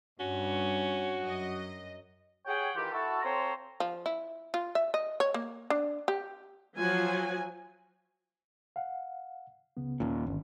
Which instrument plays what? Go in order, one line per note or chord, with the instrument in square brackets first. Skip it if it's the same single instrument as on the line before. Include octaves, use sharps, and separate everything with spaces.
[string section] G2 [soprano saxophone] C#4 [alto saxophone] F#4
[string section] F#2 D#5
[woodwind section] G4 G#4 C#5 F#5 G5
D#3 E3 F4 G4
E4 F#4 A4
C4 F4 A4 C5 C#5 A#5
[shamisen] F3
E4
F4
E5
D#5
C#5
A#3
D4
G4
[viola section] F3 F#3 G#5
[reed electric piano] F5 F#5
C#2 C#3 B3
[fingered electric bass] D#2 A#2 [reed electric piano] D#3 C#4
[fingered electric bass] G1